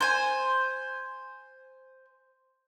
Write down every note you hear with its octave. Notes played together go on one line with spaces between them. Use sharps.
C5 G#5